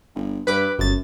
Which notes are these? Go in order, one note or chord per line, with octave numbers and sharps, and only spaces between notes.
G1
G2 B4 B5 D6
G1 F#2 A6